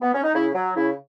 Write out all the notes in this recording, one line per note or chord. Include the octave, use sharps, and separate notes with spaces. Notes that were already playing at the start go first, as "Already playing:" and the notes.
B3
C#4
D#4
C#3 E4
F#3
C#3 E4